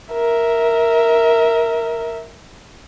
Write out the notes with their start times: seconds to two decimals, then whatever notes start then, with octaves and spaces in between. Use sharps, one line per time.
0.13 A#4 E5